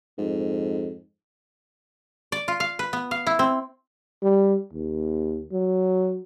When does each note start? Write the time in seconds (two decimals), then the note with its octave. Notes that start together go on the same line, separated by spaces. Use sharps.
0.18 F2 G#2
2.32 D5
2.48 F4
2.60 F5
2.79 B4
2.93 B3
3.11 F5
3.27 E4
3.39 C4
4.22 G3
4.73 D#2
5.52 F#3